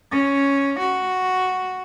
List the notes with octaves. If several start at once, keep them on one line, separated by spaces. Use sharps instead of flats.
C#4
F#4